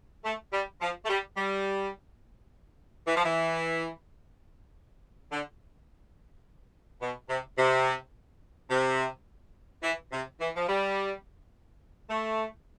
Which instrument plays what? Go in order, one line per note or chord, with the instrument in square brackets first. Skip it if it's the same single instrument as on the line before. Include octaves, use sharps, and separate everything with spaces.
[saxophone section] A3
G3
F3
A3
G3
G3
E3
F3
E3
D3
B2
C3
C3
C3
E3
C3
E3
F3
G3
A3